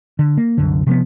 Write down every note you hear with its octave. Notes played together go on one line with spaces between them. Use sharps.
D3
A#3
C2 F#2 D3
C3 F3 B3